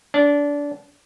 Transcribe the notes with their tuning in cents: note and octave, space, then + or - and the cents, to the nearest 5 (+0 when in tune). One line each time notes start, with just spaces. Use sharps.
D4 -20